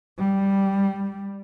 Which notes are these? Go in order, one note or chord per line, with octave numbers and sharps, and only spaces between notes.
G3